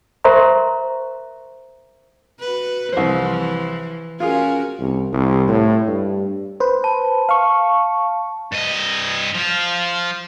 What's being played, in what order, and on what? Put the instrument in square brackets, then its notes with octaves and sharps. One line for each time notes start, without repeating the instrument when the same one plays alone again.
[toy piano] A#4 C5 E5 A#5 C6 C#6
[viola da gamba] F#4 B4
[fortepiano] C2 C5 [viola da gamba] E3 F3
[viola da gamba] C#4 F#4 A#4 [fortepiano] F4 G#4
[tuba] C2
C2
A2
G2
[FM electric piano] B4 C5
[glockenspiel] A5
[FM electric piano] F5 C#6
[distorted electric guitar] G2 D#5
F3 F4